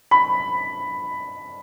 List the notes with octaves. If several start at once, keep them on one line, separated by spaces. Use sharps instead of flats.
B5